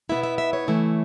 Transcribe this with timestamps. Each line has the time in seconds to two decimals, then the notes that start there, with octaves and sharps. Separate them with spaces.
0.09 B2 B3 E4 E5
0.23 E5
0.38 E5
0.53 C#5
0.67 C#3 E3 A3 E4